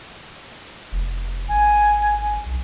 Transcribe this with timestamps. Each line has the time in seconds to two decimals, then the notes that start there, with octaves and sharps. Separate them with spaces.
0.92 F1
1.49 G#1 G#5
2.46 B1